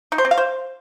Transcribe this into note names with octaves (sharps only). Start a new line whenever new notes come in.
D#4
C5
C4
F5
C5